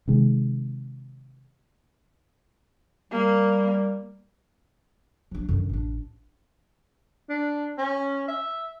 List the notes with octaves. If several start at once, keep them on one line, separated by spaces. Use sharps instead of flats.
C3 D#3 G#3
G3 A#3
F3 D4
F#2 D3
A1 D4
D4
C#4
E5